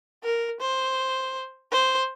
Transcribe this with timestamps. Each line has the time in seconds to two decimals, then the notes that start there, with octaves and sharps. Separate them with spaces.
0.24 A#4
0.60 C5
1.72 C5